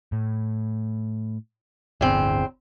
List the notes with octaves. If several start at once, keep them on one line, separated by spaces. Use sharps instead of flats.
A2
D1 G1 E2 D3 C4